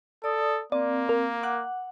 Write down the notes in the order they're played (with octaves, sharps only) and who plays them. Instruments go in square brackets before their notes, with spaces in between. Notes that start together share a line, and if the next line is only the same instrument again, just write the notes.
[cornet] A4 [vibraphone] D5 D#6
[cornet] A#3 [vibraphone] C4 [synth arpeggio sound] D5
[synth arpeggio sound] A#4
[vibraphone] F#5 [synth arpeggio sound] D6 F#6